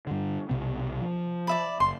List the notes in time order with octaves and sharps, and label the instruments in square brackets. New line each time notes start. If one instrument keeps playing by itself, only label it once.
[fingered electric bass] G2 D3
B1 C3 B3
F3
[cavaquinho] D5 E5 B5
[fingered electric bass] F#1 [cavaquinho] C6